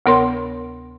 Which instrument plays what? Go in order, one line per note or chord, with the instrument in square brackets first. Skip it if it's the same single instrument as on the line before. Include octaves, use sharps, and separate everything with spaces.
[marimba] D2 C3 B3 A#4 C#5 C6